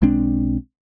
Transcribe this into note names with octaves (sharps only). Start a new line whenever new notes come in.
B1 G#3 C4 D4